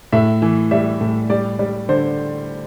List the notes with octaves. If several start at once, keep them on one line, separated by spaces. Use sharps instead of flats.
A2 E5
E3
G3 E5
A2
G3 D5
G3
D3 C5